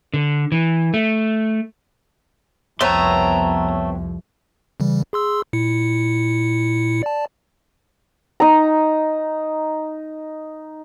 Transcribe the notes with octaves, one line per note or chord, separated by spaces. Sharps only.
D3
E3
A3
C2 F2 A3 B3 C4 C#5 A#5 C6
C#3 E3 G3
G#4 C6 E6
A#2 E4 C#7
D5 A5
D#4 A#5